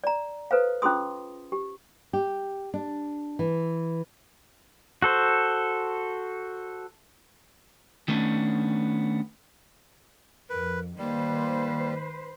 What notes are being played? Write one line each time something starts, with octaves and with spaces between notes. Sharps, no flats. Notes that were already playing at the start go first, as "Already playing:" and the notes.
D5 A#5
A4 B4 C5 F5
C#4 F4 G#4 C6 D#6
G4
G4
D4
E3
F#4 A4 C5
D#3 A3 B3 C#4 D4
F2 A#4 B4
D#3 G3 A#3 B4 C5